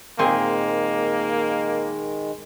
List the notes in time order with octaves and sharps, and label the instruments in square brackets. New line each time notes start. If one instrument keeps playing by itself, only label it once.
[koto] A#2 C4 G#4 [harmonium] D#3 G#3 [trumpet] A#3